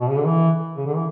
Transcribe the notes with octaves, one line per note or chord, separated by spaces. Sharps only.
B2
C#3
D3
E3
C#3
D3
E3